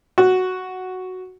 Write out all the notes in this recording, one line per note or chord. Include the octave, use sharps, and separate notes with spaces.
F#4